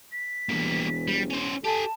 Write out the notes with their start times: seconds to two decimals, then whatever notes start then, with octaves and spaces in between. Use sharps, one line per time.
0.12 B6
0.49 E1 E3 G3 A#3
1.08 G3
1.30 C#4 C5
1.64 G4 A4 G#5 A5